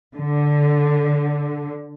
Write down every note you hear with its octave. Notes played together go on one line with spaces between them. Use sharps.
D3